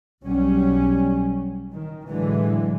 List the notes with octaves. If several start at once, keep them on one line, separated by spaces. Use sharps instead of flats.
B1 F#3 G3 C#4
D#3
A2 D3 E3 F#3 G#3